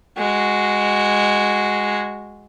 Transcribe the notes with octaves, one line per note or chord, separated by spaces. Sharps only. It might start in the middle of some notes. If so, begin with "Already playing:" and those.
G#3 F#4